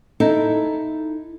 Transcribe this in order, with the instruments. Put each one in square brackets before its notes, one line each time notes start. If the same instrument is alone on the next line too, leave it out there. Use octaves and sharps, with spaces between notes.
[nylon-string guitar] D#4 E4 A4